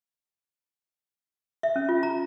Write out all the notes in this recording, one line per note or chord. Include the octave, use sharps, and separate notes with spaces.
E5
C#4
F4
A#5